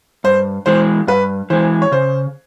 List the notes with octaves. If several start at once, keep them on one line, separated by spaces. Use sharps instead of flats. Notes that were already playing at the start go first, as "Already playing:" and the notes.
G2 C5
E3 G#3 C5
G2 B4
E3 G#3 C5
C#5
C#3 C5